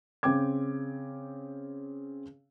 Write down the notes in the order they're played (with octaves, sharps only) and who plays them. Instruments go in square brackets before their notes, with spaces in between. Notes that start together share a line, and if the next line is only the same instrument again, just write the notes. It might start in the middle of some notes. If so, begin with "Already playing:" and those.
[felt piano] C#3 C4 G5 D6 G#6